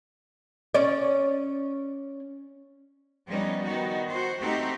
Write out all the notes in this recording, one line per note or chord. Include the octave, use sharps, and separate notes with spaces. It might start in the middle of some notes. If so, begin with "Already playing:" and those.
C#4 D5
F3 G3 B3 C#4 D#4
D#3 B3 D#4 F#4
F#4 C5
A3 C4 D#4 F#4 G4